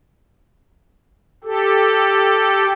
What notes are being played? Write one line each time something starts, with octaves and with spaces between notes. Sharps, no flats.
G4 A4